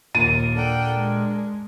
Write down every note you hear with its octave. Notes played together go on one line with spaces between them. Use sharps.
D#2 A#2 A#4 A6 D#7
D4 A4 A#4 F#5 G5
G#3